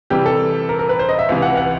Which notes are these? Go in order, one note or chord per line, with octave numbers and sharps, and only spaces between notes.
C3 E3 G3 G4
A4
A#4
A#4
B4
C5
D#5
E5
C#2 C3 E3
F#5
F#5